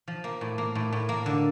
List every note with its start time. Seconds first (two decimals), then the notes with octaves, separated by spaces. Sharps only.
0.08 F3
0.24 A#3
0.41 A2
0.58 A#3
0.75 A2
0.92 A2
1.09 A#3
1.26 D3